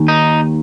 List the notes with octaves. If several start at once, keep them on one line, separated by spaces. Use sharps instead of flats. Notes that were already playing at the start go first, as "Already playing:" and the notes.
Already playing: D#2 D#3
D#4